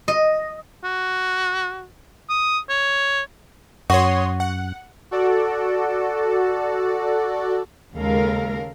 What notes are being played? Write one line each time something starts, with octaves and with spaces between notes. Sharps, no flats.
D#5
F#4
D#6
C#5
F#2 F#4 C#5 C6 D#6
F#5
F#4 A4 D5
D#2 C#3 G#3 A4 A#4 F5